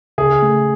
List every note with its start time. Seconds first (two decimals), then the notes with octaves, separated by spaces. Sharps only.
0.18 C#3 G#4
0.43 A3